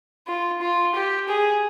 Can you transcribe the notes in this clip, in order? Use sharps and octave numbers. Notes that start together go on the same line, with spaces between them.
F4
F4
G4
G#4